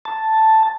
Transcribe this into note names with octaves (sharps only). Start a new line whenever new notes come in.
A5